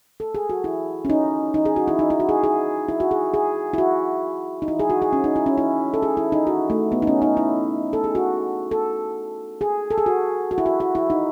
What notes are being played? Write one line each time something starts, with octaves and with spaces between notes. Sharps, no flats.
A4
G#4
F#4
E4
C#4
D#4
D#4
G#4
F#4
E4
D#4
E4
F#4
G#4
G#4
E4
F#4
G#4
G#4
E4
F#4
D#4
E4
G#4
F#4
G#4
C#4
D#4
E4
C#4
E4
A4
G#4
E4
D#4
F#4
A3
B3
D#4
C#4
D#4
E4
A4
G#4
F#4
A4
G#4
A4
G#4
F#4
F#4
E4
F#4
F#4
E4
D#4